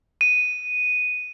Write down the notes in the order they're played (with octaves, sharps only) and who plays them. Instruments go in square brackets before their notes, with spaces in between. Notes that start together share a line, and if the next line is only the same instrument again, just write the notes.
[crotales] D#7